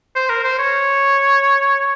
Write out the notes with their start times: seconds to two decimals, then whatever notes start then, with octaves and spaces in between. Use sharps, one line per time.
0.15 C5
0.29 A#4
0.44 C5
0.59 C#5